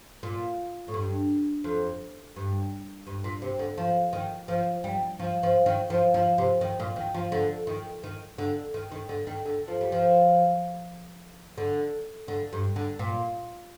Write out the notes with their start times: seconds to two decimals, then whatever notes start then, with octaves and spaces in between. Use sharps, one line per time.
0.23 A#2
0.88 A2
0.94 G2
1.64 F2
2.36 G2
3.07 G2
3.24 A#2
3.42 C3
3.59 D3
3.78 F3
4.13 D#3
4.48 F3
4.84 G3
5.19 F3
5.43 F3
5.66 D#3
5.90 F3
6.14 F3
6.38 C3
6.61 D#3
6.80 A#2
6.96 D#3
7.14 F3
7.32 D3
7.67 D#3
8.04 D#3
8.38 D3
8.74 D#3
8.91 D#3
9.09 D3
9.27 D#3
9.45 D3
9.68 F3
9.81 G3
9.92 F3
11.58 D3
12.28 D3
12.53 G2
12.76 D3
12.99 A#2